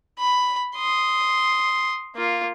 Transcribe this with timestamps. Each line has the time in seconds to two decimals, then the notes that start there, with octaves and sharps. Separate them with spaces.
0.19 B5
0.76 C6 D#6
2.16 A#3 F4